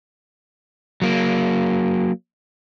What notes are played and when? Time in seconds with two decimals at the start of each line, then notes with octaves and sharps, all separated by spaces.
1.02 F#3 A#3